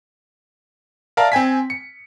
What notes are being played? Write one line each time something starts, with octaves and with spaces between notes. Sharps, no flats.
A#4 D5 E5 F5 A5 A#5
C4 G5 G#5 B6
C#7